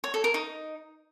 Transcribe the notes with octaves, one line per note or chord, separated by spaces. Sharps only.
C#5
A4
A#4
D#4